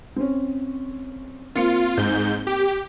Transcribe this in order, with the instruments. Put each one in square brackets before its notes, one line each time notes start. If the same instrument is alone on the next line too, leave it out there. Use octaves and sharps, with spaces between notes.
[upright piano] C4 C#4
[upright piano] A#3 C4 C#7 [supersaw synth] F4
[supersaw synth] G#2 G6
G4